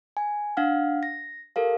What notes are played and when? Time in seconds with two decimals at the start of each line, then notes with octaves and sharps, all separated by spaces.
0.17 G#5
0.57 D4 F5 F#5 F6
1.03 A#6
1.56 G4 A4 A#4 F5